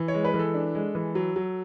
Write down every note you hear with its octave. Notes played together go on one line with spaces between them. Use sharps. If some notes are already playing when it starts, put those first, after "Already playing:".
Already playing: E3
C#5
G#3
B4
E3
A4
D4
G#3
E3
F#3
F#3